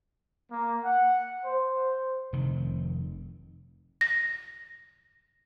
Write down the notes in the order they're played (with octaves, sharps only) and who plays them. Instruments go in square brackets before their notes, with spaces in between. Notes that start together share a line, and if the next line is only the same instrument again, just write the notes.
[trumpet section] A#3
F#5
C5
[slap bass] F1 C3 D#3
[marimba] A#6